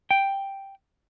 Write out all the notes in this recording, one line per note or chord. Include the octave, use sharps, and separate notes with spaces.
G5